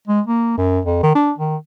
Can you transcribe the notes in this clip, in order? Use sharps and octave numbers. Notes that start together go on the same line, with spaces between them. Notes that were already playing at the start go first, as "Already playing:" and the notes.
G#3
A#3
F#2
F2
D#3
D4
D#3